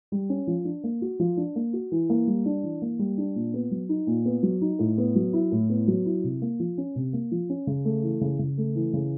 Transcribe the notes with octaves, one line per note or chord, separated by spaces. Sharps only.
G3
C#4
F3
D4
A#3
F#4
F3
D4
A#3
F#4
E3
A#3
G3
D4
E3
A#3
G3
D4
A#2
B3
F#3
D#4
A#2
B3
F#3
D#4
A2
B3
F#3
E4
A2
B3
F#3
E4
C3
A#3
F3
C#4
C3
A#3
F3
C#4
C#3
A3
E3
C#3
C#3
A3
E3
C#3